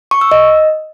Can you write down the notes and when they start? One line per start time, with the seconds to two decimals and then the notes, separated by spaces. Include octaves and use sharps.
0.11 C#6
0.21 E6
0.31 D#5